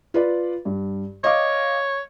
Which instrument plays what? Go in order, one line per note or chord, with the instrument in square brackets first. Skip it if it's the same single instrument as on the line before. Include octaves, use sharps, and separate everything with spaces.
[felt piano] F4 B4 D5
G2
[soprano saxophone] C#5 [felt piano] D#5 F5 D6